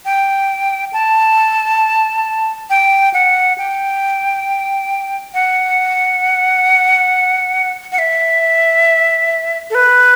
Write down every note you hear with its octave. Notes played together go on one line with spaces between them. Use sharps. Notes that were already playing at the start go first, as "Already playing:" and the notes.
G5
A5
G5
F#5
G5
F#5
F#5
E5
A4
B4